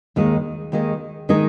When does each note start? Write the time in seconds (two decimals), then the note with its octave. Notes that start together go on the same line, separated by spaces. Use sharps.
0.16 D#2 D#3 G#3 D#4 G#4
0.72 D#2 D#3 G#3 D#4 G#4
1.29 D#3 G#3 D#4 G#4